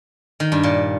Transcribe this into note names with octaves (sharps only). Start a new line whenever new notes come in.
D#3
G2
A#2